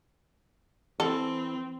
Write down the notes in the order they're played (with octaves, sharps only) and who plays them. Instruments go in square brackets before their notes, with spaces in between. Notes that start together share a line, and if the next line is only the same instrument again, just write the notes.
[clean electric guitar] E3 [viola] C4 [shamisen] A4